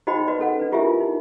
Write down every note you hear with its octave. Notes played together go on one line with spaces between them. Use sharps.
D#4 F#4 C5 D#5 G5 B5
F#4 B4 D5 D#5
C#4 A4 F#5
D4 B4
E4 F4 G4 A#4 E5 G#5
D#4